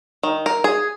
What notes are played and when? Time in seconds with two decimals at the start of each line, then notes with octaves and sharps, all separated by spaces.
0.23 D#3
0.46 A#4
0.64 G#4